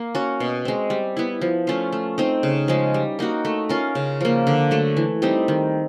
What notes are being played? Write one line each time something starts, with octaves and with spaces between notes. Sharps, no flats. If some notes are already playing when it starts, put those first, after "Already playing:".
Already playing: A#3
C#4 F#4
B2
G#3 C4
G3
B3 E4
F3
A3 C#4 F4
A3
C4 D#4
C#3
F3 G#3 C#4
G3
A#3 D#4 F#4
A3
C#4 F4 A#4
C#3
F3 A#3
D3
F#3 A3
E3
G3 C4 D#4
D#3